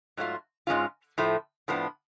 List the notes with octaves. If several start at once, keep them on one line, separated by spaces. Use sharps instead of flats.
G#2 F#3 A3 F4
G#2 G#3 C#4 F4
A2 F3 A3
A2 F3 B3 D4